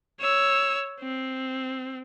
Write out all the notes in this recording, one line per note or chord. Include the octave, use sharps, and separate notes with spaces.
C#5 E6
C4